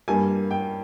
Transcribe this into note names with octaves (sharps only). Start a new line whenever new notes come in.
G2 G3 A#3 G#5
G5